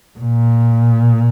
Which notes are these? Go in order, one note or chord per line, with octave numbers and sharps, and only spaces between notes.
A#2